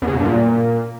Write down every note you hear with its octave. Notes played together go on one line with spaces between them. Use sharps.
E2
C#3
B2
G2
A#2